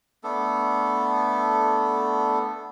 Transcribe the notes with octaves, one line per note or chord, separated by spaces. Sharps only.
A3 B3 D4 A4